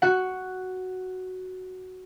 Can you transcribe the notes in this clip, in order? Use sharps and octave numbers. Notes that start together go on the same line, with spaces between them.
F#4 F#5